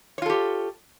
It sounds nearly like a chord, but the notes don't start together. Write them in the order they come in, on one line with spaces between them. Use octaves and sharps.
C#5 F4 A4 G4